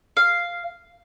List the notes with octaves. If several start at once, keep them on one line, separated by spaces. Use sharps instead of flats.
F5